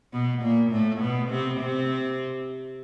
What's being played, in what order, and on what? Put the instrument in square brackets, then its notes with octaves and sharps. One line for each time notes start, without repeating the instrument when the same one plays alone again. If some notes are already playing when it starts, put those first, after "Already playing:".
[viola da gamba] B2 B3
A#2 A#3
A2 A3
B2 B3
C3 C4
C3 C4